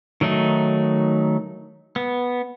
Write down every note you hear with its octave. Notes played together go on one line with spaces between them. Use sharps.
D#3 F#3 A3 D#4
B3